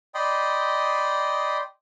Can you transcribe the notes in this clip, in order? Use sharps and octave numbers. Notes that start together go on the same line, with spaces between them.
D5 D#5 G5 B5 C6 D#6